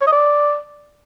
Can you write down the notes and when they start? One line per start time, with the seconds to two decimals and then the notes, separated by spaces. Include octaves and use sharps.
0.01 C#5
0.07 D#5
0.12 D5